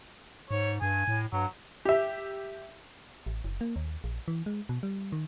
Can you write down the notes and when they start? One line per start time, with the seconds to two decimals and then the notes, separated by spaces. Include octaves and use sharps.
0.51 G#2 C#5
0.82 G2 G#5
1.08 A2
1.33 G2 F#3
1.85 G4 E5
3.26 A1
3.44 F#1
3.61 A#3
3.76 D#2
4.04 A#1
4.28 E3
4.46 G#3
4.69 B2
4.83 G3
5.12 D#3